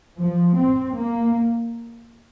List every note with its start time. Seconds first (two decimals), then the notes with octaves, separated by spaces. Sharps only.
0.19 F3
0.57 C4
0.95 A#3